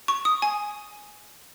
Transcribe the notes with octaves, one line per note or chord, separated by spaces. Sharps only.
C#6
D#6
G#5